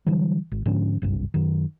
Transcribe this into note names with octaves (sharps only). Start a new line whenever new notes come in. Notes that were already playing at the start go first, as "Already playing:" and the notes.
D3 E3 F#3 G3
G#1
G#2 D3 F3 C#4
F#1 C2 G2
F#2 D#3